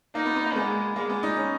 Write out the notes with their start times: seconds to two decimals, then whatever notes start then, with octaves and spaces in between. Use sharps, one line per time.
0.15 A#3 D#4
0.26 B3
0.36 B3
0.46 A#3
0.56 G#3 B3
0.96 G#3 A#3
1.09 B3
1.23 D#4
1.37 C#4